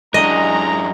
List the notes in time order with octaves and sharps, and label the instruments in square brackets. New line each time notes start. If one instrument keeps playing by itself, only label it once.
[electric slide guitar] F#2 D4 [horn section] E3 G#3 A#5 [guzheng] D#5